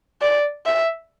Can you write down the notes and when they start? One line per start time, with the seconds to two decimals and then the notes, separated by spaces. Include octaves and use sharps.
0.22 D5
0.66 E5